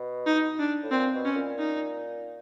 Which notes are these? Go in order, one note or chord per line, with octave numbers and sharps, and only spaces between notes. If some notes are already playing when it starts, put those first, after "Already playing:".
Already playing: B2
D#4
D4
A2
A#2 C4
B2
C#4
A#2
D#4